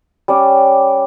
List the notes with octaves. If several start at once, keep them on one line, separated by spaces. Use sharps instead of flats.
G3 C#4 D5